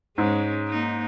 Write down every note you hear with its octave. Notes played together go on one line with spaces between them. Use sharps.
G#2 G#3 C#4
A#3 D#4